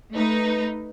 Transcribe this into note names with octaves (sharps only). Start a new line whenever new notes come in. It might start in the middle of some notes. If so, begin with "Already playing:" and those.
A3 D#4 B4